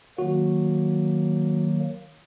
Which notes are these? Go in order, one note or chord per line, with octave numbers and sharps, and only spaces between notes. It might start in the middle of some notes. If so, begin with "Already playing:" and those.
D#3 F#3 A#3 F#4